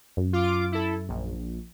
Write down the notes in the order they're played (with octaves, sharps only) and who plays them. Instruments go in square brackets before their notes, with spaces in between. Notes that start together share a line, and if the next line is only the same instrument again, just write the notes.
[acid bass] F#2
[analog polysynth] F4 D6
E4 A4
A#1